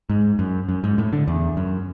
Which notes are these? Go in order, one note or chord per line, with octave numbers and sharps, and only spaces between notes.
G#2
F#2
F#2
G#2
A2
D3
E2
F#2